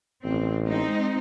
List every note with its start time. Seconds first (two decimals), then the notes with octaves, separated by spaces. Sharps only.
0.25 A1 C4
0.66 G#3 C4 D#4